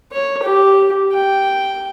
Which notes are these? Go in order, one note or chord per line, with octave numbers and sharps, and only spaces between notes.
C#5
G4
G5